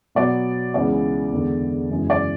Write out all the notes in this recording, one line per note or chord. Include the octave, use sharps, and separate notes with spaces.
B2 F#3 B3 D5
C#2 C#3 E3 B3 D5
E2 D3 G#3 B3
F#2 C#3 E3 G#3
D5